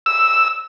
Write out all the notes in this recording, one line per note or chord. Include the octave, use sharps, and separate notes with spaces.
E6